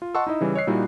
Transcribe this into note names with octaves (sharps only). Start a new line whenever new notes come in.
F4
D#5 F#5 A5 C6 C#6 E6
D#4 E4 D#5
C#3 E3 G3
C#5 D#5 F#6 C7
A#2 G3 D#4 E4 F#4